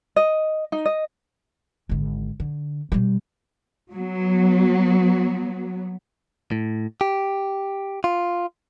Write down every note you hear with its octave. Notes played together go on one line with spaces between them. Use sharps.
D#5
D#4
D#5
G#1 D3
D3
B2 G3
F#3 B3
A2
G4
F4